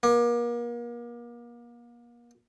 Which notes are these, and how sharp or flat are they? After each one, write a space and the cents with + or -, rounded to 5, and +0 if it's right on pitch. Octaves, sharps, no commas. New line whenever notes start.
A#3 +35